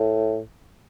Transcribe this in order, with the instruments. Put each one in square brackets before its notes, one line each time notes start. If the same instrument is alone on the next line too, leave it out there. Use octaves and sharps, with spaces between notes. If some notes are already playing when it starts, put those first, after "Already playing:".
Already playing: [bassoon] A2